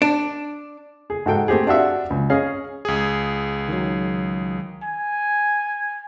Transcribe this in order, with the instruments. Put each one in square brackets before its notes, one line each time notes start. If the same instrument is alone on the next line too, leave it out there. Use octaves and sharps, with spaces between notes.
[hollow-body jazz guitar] D4
[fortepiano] G#4
G#2 F#4 A4 G5
A3 C4 G4 G#4
D4 F4 F#4 E5
C#2
C#4 G#4 D#5 F5
[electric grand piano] C#2 G#4
[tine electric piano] D#3 F#3
[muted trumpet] G#5